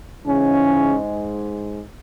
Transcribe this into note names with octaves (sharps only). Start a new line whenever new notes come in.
G#2 C#3 E3 G#3 C#4